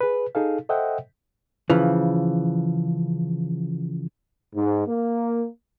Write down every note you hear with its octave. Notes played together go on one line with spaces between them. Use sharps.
G#4 B4
D#4 G#4 A4 F5
A4 C5 D#5 E5 F#5 G5
C#3 E3 F3
G#2
A#3